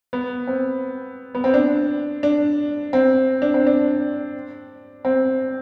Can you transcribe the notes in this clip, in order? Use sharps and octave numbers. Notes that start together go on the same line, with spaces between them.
B3
C4
B3
C4
D4
D4
C4
D4
C4
D4
C4